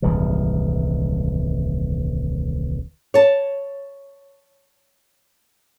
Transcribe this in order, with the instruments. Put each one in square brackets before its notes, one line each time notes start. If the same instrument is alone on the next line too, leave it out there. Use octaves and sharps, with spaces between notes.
[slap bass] D#1 C2 G#2 E3
[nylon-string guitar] C#5 A5